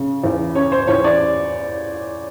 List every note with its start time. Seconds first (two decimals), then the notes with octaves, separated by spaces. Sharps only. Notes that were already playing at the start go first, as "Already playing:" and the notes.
Already playing: C#3
0.24 E2
0.55 C#3 C#5
0.72 C5
0.87 E2 C#5
1.04 D5